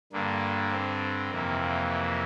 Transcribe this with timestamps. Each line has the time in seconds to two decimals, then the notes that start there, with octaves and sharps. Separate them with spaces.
0.13 G2 D3 A#3
0.72 C4
1.30 F2 C3 E3 A#3
1.60 A#3